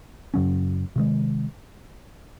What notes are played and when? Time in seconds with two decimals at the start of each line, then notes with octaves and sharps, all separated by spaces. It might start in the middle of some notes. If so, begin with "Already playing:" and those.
0.34 F#2 C#3 F#3 C#4
0.96 C3 D#3 G#3